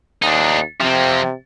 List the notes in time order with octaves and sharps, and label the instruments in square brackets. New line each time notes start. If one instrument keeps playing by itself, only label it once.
[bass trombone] D#2 [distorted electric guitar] D4 D#4
[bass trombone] C3 [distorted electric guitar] F3 C4